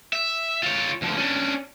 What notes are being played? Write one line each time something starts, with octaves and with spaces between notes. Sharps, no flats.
E5
F4 C#5
D2 F3
C#4 D4